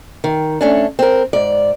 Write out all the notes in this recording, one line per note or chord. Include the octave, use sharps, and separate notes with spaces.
D#3
A3 C#4 D4
C4 A#4
G#2 D5